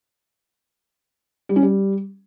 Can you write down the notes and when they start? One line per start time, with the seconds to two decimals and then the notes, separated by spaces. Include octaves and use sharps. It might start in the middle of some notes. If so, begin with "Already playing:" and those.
1.49 G3
1.56 C#4
1.63 G3